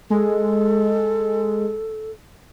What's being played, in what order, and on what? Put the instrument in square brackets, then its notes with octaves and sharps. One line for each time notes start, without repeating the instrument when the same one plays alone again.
[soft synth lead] G#3 [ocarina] A4